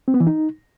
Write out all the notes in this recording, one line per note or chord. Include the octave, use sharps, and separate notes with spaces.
C4
B3
E3
D#4